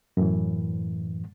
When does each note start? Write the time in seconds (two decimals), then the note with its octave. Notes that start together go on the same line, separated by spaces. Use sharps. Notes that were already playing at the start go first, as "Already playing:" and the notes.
0.17 F#2 A2 E3